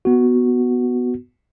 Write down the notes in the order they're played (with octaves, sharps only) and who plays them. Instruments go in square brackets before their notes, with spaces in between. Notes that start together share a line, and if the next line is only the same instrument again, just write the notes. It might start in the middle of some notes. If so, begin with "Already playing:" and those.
[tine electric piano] B3 F#4